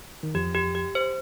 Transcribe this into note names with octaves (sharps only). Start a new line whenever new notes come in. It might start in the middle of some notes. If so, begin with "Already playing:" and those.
D#3
F2 F3 G4
G4
G4
C5